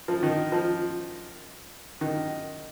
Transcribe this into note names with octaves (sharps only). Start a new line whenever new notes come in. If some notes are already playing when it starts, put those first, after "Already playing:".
F3
D#3
F3
D#3